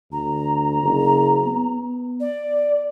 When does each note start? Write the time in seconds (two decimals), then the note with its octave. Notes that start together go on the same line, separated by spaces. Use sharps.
0.12 D2 A#5
0.82 F#1
1.47 B3
2.20 D5